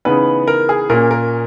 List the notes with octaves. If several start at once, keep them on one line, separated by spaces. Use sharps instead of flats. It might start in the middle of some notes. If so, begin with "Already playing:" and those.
C#3 E3 B3 D#4 B4
A#4
G#4
A#2 A#3 C#4 A#4
A#4